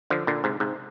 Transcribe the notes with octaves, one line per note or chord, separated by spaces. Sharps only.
D3 F3
A#2 D3
G#2 C3
G#2 C3